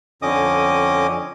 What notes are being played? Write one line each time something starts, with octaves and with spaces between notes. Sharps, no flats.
F2 D3 C#4 D#5 D6 D#6